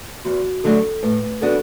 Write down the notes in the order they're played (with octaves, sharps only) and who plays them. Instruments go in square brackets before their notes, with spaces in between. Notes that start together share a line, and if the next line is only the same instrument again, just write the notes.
[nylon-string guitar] E2 [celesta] F#4
[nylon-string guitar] D3 F#3 A3 D4 [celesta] A4
[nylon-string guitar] A2 [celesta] B4
[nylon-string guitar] E3 B3 D4 F#4 [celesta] A4